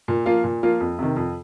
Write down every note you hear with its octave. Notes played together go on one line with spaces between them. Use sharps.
A#2
F3 A#3 F4
A#2
F3 A#3 F4
F2
C3 D#3
F2